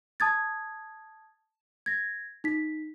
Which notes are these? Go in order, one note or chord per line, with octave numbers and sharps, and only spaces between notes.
A5 D#6 G#6 A6
G#6 A#6
D#4 B6